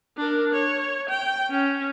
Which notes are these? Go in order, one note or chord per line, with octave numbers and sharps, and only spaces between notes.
D4 A#4
C#5
G5
C#4